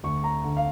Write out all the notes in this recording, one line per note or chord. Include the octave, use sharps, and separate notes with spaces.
D2 C#6
A#5
D3
F5